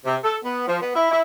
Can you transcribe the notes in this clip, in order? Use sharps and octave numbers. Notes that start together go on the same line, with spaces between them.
C3
A4
B3
F3
B3
E4
E4